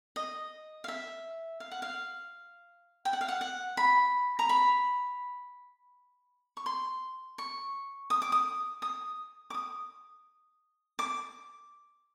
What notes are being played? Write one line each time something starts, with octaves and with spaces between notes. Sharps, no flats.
D#5
F5
E5
F5
F#5
F5
G5
F#5
F5
F#5
F#5
B5
A#5
B5
C#6
C6
C#6
D#6
D6
D#6
D#6
D6
D#6
D6